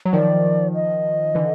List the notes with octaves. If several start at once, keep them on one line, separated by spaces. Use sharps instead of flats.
F#3
D#3 F3 D5
D#5
D3 E3